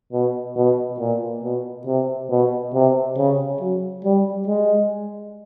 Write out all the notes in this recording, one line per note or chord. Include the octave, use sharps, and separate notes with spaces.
B2
B2
A#2
B2
C3
B2
C3
C#3
F#3
G3
G#3